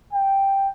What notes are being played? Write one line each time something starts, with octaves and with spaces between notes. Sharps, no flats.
G5